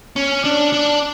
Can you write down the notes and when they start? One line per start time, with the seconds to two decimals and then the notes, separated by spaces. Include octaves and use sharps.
0.16 C#4
0.44 D4
0.73 D4